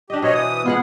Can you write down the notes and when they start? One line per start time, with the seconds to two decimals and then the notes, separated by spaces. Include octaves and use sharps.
0.10 D4 G4 D#5
0.22 B2 C5 C#5 D#5
0.34 E3 D#6
0.66 G#3 B3 F4 G#4 F#5